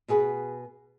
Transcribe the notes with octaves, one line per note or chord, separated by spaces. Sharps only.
B2 F#4 G#4 B4